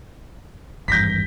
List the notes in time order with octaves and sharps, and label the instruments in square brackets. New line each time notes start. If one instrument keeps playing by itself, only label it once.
[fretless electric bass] G#1 E2 G2 [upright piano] G6 A#6 B6